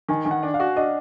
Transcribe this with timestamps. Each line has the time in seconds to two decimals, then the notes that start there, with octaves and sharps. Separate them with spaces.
0.08 D#3 G#5
0.25 D#3 G#5
0.31 F#5
0.43 D4
0.54 F5
0.60 F#4
0.76 D4 D#5